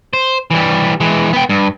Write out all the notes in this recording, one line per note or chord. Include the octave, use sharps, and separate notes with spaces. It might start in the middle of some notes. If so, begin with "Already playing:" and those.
C5
E3 G3
E3 G#3
B3 G5
G2